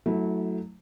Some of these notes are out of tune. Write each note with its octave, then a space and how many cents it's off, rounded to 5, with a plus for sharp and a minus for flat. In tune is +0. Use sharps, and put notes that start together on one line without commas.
F#3 +0 A3 +0 E4 -30